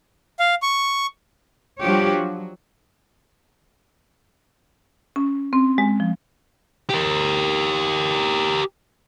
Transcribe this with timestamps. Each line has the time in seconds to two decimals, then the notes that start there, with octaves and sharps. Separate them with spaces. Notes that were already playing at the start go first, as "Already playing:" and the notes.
0.39 F5
0.62 C#6
1.81 F3 G3 D4 F#4 G4 C#5
2.14 F#3
5.16 C#4
5.53 C4
5.78 G#3
6.00 F3
6.89 G4 A#4